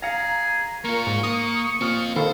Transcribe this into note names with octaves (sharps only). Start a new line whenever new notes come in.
G#4 F5 A#5 C#7
A#3 F4 A#4 C#6
G#2
A#3 D#6
A#2 C4 F4 F6
D#3 A4 C5 F5 B5